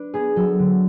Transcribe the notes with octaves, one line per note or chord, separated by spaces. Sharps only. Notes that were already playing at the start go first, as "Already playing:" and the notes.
Already playing: D4 B4
B3 G#4
F#3 A4
D3